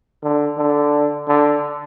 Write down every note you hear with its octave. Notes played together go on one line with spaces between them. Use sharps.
D3
D3
D3